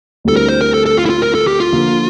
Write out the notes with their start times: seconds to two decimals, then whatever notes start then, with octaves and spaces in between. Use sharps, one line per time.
0.24 D2 D3 G3 C4 E4 A4
0.36 A#4
0.49 C5
0.61 A#4
0.74 A4
0.86 A4
0.97 F4
1.05 E4
1.10 F4
1.22 A#4
1.35 A4
1.47 G4
1.60 F4
1.72 D3 F3 A#3